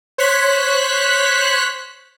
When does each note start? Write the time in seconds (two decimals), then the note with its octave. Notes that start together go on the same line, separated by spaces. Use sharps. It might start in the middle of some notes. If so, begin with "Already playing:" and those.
0.18 C5 C#5 F#6 B6